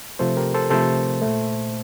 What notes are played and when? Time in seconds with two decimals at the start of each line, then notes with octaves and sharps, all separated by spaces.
0.19 C3 F3 A3 A4 C5
0.37 G4 A#4
0.54 A4 C5
0.70 C3 F3 A3 A4 C5
1.22 A#2 A3